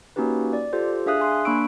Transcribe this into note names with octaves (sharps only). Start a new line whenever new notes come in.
A#3 C#4 D#4 F#4 G4 B4
D5
F4 G4 A4 C5
D4 G#4 E5 F5 D#6 F#6
G#5 C6 F#6
A#3 D4 B5 C#6 E6 D7